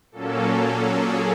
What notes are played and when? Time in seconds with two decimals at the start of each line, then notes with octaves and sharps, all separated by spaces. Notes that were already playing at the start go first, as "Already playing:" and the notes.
0.12 A#2 F#3 A#3 C#4 A4
0.92 G#4